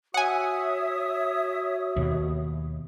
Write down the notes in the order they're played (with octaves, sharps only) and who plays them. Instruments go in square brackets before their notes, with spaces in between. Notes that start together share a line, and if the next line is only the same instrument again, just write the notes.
[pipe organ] F#4 [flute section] C#5 E5 D#6 [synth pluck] F#5 G#5
[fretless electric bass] D#2 B2